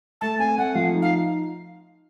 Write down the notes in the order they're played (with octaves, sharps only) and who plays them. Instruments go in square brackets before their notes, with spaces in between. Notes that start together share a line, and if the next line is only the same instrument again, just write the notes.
[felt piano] A3 [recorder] A5
[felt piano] C4 [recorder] G#5
[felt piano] A3 [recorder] F#5
[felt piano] F3 [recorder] F5
[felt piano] D#4
[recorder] F5